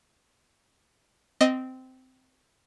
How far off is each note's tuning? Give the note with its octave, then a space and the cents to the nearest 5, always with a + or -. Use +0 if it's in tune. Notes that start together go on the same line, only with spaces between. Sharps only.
C4 -15 D#5 +0